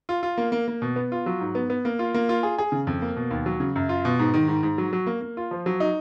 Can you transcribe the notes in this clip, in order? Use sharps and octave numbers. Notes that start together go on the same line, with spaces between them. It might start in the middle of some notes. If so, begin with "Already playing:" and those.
F4
F4
A#3
A#3
A#3
B2
B3
F4
F#3
G#2
B3
B3
A#3
F4
A#3
F4
G#4
G#4
C#3
F2
A#3
B2
D#2
F#3
C#3
F#2
F4
B2
G#2
D#3
G#2
G#2
F#3
F#3
A#3
A#3
F4
F3
F#3
D#4